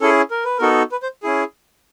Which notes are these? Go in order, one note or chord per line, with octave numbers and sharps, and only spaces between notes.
C#4 E4 G#4 A4
A#4
B4
B3 D#4 F#4 A4 A#4
B4
C5
C#4 E4 G#4